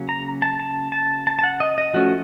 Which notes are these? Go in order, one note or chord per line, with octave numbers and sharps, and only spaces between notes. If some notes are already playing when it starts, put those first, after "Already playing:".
Already playing: C#3 F#3 A#3 C#4
A#5
A5
A5
A5
A5
A5
F#5
D#5
D#5
F3 A3 C#4 F#4